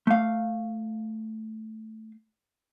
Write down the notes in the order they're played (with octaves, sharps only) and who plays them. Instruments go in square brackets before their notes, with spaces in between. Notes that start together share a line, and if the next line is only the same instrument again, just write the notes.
[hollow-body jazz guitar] A3 F5